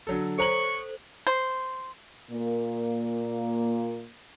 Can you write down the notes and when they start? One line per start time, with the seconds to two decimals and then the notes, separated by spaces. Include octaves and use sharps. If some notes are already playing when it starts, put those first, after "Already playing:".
0.07 D3 F#3 A4
0.39 A4 C5 C#5 A#5 C#6 F#7
1.27 C5
2.31 A#2 A#3